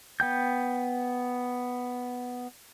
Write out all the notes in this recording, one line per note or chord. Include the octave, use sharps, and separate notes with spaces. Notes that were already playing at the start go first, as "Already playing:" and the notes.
B3 G5 G6